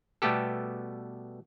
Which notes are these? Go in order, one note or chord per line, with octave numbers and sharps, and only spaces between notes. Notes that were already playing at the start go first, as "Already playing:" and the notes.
B2 G3 A3 B3 G4 A4